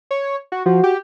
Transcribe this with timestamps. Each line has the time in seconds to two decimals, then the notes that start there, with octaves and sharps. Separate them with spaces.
0.11 C#5
0.52 F#4
0.66 F3 F#4
0.84 G4